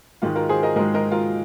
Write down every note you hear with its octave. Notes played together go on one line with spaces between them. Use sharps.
G#2 D#3 G#3 F4
F4 A#4
G#4 C5
A#4 D#5
G#2 D#3 G#3 A#4 D#5
A#4 D#5
F4 A#4